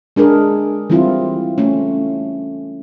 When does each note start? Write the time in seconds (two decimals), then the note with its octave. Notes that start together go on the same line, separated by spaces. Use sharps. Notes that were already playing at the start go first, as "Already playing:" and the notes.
0.16 G#3 D4 G#4 A#4
0.90 E3 G3 C4 E4 F4
1.58 A3 C#4